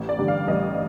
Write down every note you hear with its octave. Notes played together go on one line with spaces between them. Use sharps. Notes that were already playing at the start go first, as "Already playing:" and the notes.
Already playing: A1
D5
G2 D3 G3
F5
A1 D#5